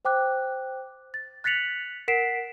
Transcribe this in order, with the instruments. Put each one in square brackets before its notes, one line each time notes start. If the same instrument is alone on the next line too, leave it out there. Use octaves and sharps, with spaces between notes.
[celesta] C5 G5 D6 F#6
A6
F#6 A6 B6 C#7 F7 F#7
A#4 F#5 B6 C7 D7 E7